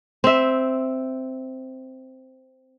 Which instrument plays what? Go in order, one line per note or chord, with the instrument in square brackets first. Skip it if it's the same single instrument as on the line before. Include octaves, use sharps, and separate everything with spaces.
[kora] C4 E5